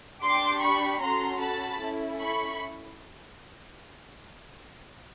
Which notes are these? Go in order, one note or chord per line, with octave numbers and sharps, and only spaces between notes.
D4 G4 C6 D6
B5 C#6
C#4 F#4 A4 A#5 C6
A5 B5
C#4 E4 A4
B5 C#6